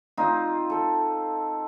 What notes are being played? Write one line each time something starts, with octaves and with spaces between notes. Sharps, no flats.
C4 D#4 F4
A4